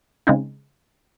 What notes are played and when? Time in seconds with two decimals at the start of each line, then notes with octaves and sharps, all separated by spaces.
0.27 C#3 G#3 C4 D#4